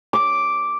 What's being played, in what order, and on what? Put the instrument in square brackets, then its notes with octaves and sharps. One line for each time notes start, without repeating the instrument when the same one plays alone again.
[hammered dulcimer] D6